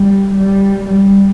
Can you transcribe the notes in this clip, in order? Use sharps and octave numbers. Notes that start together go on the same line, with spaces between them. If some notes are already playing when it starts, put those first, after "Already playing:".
Already playing: G3
G3
G3